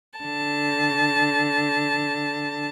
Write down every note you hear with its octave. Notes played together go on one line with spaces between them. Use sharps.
D3 A5